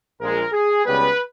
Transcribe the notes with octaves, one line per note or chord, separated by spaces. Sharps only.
A#1 A#2 G#3 A#4
G#4
C#2 C#3 G3 B3 B4